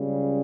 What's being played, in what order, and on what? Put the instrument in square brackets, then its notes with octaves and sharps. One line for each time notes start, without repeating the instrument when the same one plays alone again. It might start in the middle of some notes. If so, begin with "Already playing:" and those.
Already playing: [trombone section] C#2 C#3 G3